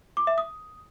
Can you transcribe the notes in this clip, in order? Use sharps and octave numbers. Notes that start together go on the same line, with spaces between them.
D6
E5
D#6